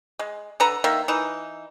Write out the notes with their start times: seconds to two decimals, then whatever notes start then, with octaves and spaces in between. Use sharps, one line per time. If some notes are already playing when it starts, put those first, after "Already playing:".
0.19 G#3
0.60 D3 A4 B4 A#5
0.84 D#3 A#3 E5
1.08 E3 D#4